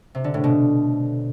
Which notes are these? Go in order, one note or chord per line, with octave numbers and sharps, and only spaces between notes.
C3
D3
A2
B2